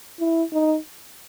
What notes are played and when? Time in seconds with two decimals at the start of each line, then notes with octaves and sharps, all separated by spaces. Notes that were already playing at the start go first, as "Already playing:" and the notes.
0.20 E4
0.53 D#4